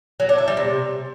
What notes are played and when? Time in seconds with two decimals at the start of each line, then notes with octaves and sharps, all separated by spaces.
0.20 F#3
0.29 D4
0.38 E4
0.48 G3
0.57 C3